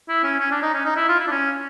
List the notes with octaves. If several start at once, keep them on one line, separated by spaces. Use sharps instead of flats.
E4
C#4
C#4
D4
D#4
C#4
D#4
E4
F4
E4
D4
C#4